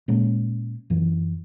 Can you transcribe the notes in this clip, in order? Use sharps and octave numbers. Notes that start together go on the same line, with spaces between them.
A#2 G#3 C#4
F#2 E3